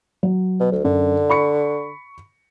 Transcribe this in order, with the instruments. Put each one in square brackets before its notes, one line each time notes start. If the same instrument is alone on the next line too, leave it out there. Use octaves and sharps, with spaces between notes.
[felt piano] F#3
[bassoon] B2
D2
[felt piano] F#2 [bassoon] D3
[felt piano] B5 C#6 C#7